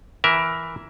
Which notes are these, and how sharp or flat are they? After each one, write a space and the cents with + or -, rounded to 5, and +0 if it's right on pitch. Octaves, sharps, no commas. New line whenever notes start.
E3 +0 A#4 +15 E5 +0